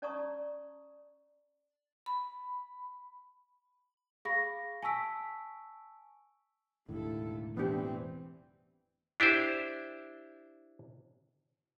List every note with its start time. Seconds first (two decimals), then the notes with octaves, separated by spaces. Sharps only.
0.02 C#4 D5 A5 A#5 C#6 D#6
2.06 B5
4.25 G#4 F5 B5 C#6 A#6
4.83 G#5 A5 C#6 E6 B6 D7
6.89 E1 D#2 A2 D3 E4 A4
7.57 E3 B3 C4 D4 G4
9.20 D4 E4 G4 C5